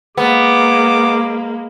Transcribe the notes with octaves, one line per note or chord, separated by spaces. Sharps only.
G#3 A#3 B3 D6